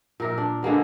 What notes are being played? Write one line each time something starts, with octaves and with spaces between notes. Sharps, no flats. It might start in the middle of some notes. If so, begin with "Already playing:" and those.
A#2 A#4 E5
D4
D3 G#3 A#3 B3